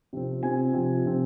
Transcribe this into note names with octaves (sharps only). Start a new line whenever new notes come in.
C3 F3 C4
C3 F3 C4 G#5
C3 F3 C4
C3 F3 C4